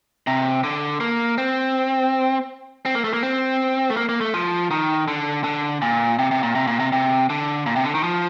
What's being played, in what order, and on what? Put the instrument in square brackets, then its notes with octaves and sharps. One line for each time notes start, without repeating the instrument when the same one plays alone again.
[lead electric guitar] C3
D3
A#3
C4
C4
A#3
A3
A#3
C4
A3
A#3
A#3
A3
F3
D#3
D3
D3
A#2
C3
C3
A#2
C3
A#2
C3
C3
D3
A#2
C3
D3
D#3
F3